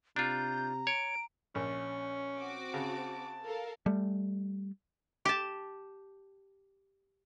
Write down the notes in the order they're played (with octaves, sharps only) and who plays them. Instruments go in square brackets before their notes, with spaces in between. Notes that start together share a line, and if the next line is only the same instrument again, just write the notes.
[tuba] C3 [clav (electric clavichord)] D4 F4 [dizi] A#5 [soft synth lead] G6
[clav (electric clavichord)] C#5 [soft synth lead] D7
[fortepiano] A#1 [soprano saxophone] C#4
[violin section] C4 F#4 D6
[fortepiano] C#3 [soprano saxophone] A5
[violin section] A4 A#4 F5
[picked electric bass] G3 A3
[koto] G4 A5